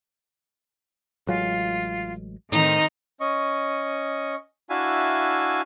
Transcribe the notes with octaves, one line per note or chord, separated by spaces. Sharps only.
A1 F#3 G#3 F4
A2 D#3 C4 D#4 D#5 A#5
C#4 D#5 C#6
D4 E4 F#4 E5 F5 G#5